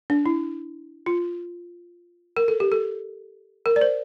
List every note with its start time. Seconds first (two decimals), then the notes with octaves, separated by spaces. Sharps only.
0.10 D4
0.26 E4
1.06 F4
2.37 A#4
2.48 A4
2.60 G4
2.72 A4
3.66 A#4
3.76 D5
3.81 C5